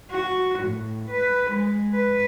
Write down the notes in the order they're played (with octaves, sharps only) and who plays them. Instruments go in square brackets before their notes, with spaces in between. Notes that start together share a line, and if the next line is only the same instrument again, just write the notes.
[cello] F#4
A2
B4
G#3
B4